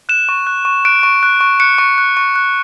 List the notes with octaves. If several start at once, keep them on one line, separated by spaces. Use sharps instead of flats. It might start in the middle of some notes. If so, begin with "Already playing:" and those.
F#6 E7
C#6
F#6
C#6
F#6 D7
C#6
F#6
C#6
F#6 C#7
C#6
F#6
C#6
F#6